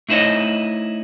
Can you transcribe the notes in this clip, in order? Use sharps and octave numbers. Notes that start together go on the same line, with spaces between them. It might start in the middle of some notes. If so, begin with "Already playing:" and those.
A3 D#4 E4 C5 C#5 D#5